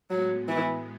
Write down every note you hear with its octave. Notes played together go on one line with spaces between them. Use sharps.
A2 F#3 G#3 B3
E3